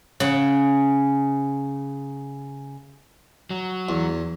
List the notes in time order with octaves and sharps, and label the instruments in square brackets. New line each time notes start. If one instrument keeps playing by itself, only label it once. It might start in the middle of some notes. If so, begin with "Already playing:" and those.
[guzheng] C#3 F#5
[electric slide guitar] F#3
[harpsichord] E2